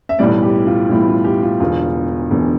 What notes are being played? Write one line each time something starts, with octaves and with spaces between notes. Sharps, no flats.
E5
B1 A2 E3 G3 D5
G4
F4
B1 A2 E3 G3 E4
F4
G4
F4
E1 E2 D3 F4
E1 E2 D3